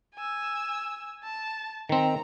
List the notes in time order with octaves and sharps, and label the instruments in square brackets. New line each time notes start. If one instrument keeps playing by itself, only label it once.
[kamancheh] G#5 E6
A5
[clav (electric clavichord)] D#3 C4 [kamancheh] A#5